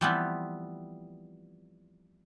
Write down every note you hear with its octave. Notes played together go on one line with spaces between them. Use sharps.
E3 F3 G3 A3 B3 C4